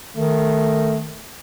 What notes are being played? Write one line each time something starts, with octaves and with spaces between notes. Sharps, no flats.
D#3 A3